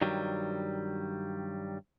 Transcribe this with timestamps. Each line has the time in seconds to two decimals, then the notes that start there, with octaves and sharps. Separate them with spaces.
0.01 G2 D#3 F#3 G3